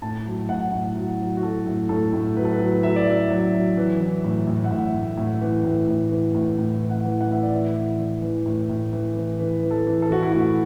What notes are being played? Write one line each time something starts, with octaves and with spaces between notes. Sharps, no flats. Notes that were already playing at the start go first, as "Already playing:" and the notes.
A2 A5
F#3
A2 F#5
A2
F#3
F#3
F#4
F#3 A4
A2
A2 A4
A2
F#3 B4
A4
B4
F#3
F#3 E5
D5
F#3 E5
F#3
F#3
E3
E3
A2
A2
F#5
A2 E5
A2
A2
E3
A2
A2
E3
A2
A2
E3
F#5
E3
F#5
A2 E5
D5
E3 E5
E3
E3
E3
A2
A2
E3
E3
E3 B4
E3
A4
E3
A4
E3 F#4
E4
A2 F#4